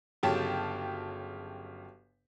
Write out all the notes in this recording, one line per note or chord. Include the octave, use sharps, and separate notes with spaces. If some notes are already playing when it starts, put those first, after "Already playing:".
G1 C#3 F#3 G4 G5 A5